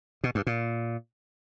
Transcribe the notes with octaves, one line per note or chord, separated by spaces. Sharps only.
B2
G2
A#2